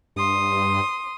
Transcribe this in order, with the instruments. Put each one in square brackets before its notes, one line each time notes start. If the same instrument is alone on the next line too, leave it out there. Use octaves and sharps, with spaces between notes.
[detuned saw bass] G2 [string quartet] C6 D#6